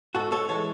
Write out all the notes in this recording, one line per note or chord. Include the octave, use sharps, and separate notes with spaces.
G#2 F#4 A4
A4 C#5
E3 G#3 A4 C#5